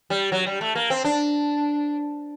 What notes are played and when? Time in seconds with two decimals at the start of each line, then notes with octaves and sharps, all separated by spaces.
0.10 G3
0.32 F#3
0.47 G3
0.61 A3
0.75 A#3
0.90 C4
1.05 D4